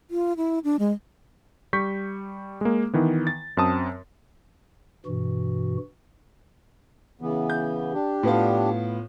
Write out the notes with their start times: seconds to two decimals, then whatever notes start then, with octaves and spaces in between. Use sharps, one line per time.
0.11 F4
0.37 E4
0.64 D4
0.79 G#3
1.73 G3 C#6 G6 B6
2.61 G#3 A#3
2.94 D#3 E3 B3
3.27 A6
3.57 F#2 C4 A5 D#6
5.06 G2 B2 E3 F#4
7.21 C#3 E3 B3
7.50 G6
7.93 D4 G4
8.23 A2 B3 F4